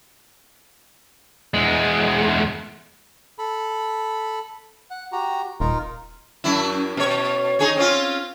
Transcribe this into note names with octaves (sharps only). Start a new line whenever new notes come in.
E2 G#3
A4 B5
F#5
F#4 G4 A#5
D#1 D#4 F4 A#4
F#2 E4
B2 C#5
D#4 G#4 C#5
C4 C#4 F4